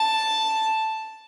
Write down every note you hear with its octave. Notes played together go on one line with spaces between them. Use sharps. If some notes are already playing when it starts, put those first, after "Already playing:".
Already playing: A5